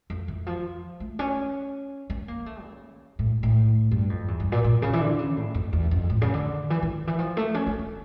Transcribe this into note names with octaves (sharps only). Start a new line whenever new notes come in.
F2
E3
F3
A3
C#4
C#4
A#3
A3
C#3
A2
A2
G2
F2
E2
G2
A#2
A#2
C#3
E3
D3
C#3
A2
F2
E2
F2
A2
C#3
D3
E3
D3
E3
F3
A3
C#4
D4
D4